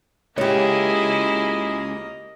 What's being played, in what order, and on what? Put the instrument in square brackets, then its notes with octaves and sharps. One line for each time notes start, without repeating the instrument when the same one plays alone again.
[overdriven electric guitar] C#2 [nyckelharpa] A#3 D#5 [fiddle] E4 G#4 [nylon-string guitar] G4 C#5